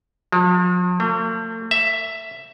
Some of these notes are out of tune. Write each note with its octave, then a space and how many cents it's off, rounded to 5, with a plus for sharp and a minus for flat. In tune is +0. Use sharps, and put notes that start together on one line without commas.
F3 +45
A3 +45
E5 +5